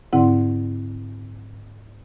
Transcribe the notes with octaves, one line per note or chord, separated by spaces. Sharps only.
G#2 D3 C4 E4 F#5